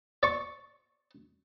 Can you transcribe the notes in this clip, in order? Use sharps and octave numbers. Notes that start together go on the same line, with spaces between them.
D5 C#6